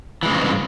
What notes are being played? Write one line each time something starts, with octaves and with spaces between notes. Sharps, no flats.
G2 C#3 E3 G#3 C4